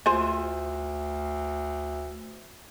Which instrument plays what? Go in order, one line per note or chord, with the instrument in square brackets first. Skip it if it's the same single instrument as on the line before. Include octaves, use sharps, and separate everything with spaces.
[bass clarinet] D2 [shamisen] F4 C5 G#5